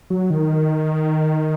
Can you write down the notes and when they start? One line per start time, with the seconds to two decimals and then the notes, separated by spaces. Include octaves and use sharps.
0.10 F#3
0.30 D#3